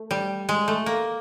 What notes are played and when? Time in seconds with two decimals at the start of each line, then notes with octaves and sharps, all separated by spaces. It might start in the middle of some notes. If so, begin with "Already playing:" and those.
Already playing: A3
0.11 G3
0.49 G#3
0.68 A3
0.86 A#3